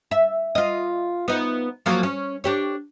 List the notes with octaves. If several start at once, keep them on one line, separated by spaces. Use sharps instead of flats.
E5
F4 D#5
B3 D#4
F3 F#3 A#3
C#4
D4 G4 C#5